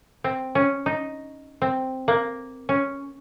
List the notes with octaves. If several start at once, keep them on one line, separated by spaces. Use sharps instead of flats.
C4
C#4
D#4
C4
A#3
C#4